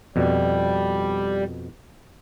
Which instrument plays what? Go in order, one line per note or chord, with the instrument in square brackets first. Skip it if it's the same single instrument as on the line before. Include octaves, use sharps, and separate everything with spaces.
[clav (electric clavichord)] F2 B2 [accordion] G3